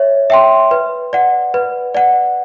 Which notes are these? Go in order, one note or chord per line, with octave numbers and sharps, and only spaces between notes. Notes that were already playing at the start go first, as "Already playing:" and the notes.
Already playing: C#5 E5
E5 G5 C6
B4
D5 F#5
B4
D5 F#5